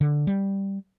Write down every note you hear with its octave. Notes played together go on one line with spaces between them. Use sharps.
D3
G3